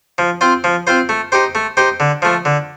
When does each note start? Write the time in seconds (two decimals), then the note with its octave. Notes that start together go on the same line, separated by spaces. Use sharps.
0.18 F3
0.41 C4 F4 C5
0.64 F3
0.87 C4 F4 C5
1.09 A3
1.32 D#4 G4 C5
1.55 A3
1.77 D#4 G4 C5
2.00 D3
2.22 F3 A3
2.45 D3